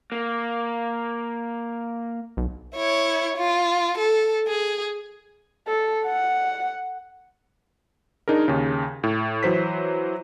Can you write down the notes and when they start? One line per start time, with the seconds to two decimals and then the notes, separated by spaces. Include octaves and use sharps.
0.12 A#3
2.37 B1
2.75 E4 C#5
3.37 F4
3.98 A4
4.48 G#4
5.68 A4
6.06 F#5
8.28 D4 D#4 G#4 A#4
8.48 D#2 C#3
9.03 A2
9.43 E3 F#3 C5 B6